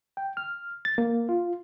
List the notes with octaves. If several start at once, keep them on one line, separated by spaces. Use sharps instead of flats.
G5
F6
A6
A#3
F4